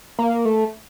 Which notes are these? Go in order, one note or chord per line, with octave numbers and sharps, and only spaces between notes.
A#3
A3